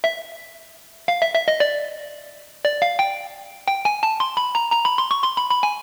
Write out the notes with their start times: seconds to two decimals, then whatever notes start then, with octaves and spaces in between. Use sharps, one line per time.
0.04 E5
1.08 F5
1.22 E5
1.35 E5
1.48 D#5
1.60 D5
2.64 D5
2.82 F5
2.99 G5
3.68 G5
3.85 G#5
4.03 A5
4.20 C6
4.37 B5
4.55 A#5
4.72 A#5
4.85 B5
4.98 C6
5.11 C#6
5.23 C6
5.37 B5
5.50 B5
5.63 G#5